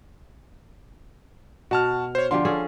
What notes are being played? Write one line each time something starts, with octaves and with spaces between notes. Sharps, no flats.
B2 F#4 A5 F6
C5 C#5
D3 F3 G4 C6
C#4 G#4 A4